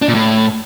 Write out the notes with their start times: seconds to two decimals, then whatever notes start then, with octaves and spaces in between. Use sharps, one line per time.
0.02 D4
0.08 A#2
0.14 A2